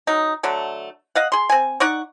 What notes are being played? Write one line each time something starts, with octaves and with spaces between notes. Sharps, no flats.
F#3 D#4
D3 F#3 A3
D#5 F5 F#5
G#4 C6
C4 G#5
D#4 D5 F#5 C#6